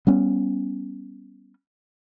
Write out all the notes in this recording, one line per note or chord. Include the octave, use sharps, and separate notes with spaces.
G3 B3 C#4